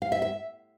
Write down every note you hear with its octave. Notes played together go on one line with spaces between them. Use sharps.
F5
E5
E5